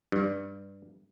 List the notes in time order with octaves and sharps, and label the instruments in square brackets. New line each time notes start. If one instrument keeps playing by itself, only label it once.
[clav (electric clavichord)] G2